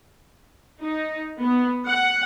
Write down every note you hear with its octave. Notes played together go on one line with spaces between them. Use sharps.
D#4
B3
F#5